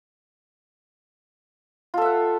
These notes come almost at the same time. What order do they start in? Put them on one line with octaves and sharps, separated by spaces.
F4 A4 E5 F#5